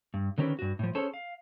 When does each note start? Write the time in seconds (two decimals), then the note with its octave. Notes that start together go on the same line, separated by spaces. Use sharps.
0.14 G2
0.38 D3 D#3 C4 C#4 G4 B4
0.59 G2 F#4
0.79 A2 F3
0.95 C#4 G#4 A4 C5 C#5
1.14 F5